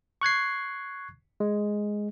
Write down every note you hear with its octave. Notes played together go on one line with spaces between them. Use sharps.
C#6 F#6 G#6 C7
G#3